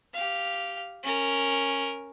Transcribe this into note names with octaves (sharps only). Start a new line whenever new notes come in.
G4 F5
C#4 A#4